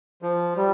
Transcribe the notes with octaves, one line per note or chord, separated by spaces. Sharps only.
F3
G3